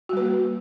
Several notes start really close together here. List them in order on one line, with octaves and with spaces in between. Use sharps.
F#4 G3 B4 A#3